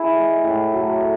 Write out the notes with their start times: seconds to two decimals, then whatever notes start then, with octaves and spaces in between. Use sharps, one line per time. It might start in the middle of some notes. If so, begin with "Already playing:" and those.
Already playing: E4 G#4
0.16 G#3
0.44 A2
0.73 F#3 A3